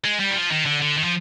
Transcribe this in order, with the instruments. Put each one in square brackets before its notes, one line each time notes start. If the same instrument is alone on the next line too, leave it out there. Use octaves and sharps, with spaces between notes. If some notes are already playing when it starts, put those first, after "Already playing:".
[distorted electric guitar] G#3
G3
D#3
F3
D#3
D3
D3
D#3
F3